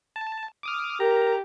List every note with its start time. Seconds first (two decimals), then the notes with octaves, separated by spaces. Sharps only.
0.16 A5
0.63 D6 D#6 F6
1.00 G4 A#4 A#5